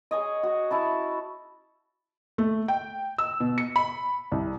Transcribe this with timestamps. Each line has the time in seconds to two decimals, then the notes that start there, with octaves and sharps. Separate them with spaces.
0.11 G#4 C#5 D#5
0.43 F#4
0.71 E4 A5 B5
2.38 A3
2.68 G5
3.18 E6
3.40 B2
3.58 C#7
3.76 B5
4.32 C2